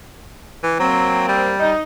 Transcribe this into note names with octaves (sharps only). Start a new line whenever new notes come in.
E3
F#3 A#3 C4
G3
D#4